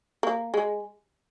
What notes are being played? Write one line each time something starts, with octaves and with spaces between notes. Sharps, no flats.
A#3
G#3